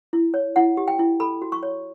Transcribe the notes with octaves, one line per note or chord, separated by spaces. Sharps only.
E4
C#5
E4 F#5
G4
G5
E4
A4 B5
F#4
C#6
C#5